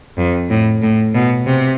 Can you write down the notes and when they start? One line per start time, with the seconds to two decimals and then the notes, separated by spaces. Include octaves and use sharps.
0.18 F2
0.50 A2
0.82 A2
1.15 B2
1.46 C3